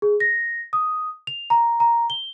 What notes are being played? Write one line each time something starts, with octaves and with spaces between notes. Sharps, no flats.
G#4
A#6
D#6
F7
A#5
A#5
G7